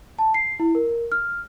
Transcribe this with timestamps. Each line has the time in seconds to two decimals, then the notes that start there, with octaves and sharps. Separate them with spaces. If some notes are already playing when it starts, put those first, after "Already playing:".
0.19 A5
0.34 C7
0.60 E4
0.75 A#4
1.12 F6